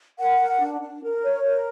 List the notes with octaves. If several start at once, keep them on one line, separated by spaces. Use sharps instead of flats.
A#4 F#5
A#4
D4
D4
A#4
C#5
A#4